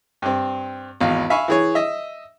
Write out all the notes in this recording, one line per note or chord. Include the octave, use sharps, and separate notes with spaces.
G2 C4
G#1 E2 F5
E5 F5 G#5 B5 C#6
E3 G#4 C#5
D#5 E5